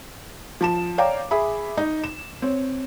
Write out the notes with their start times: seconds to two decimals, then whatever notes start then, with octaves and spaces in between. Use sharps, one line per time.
0.61 F3 A5 E7
0.98 C#5 D5 F5 G5 A#5 D6
1.31 G#4 E5 B5
1.78 D#4
2.04 E7
2.42 C4 C#5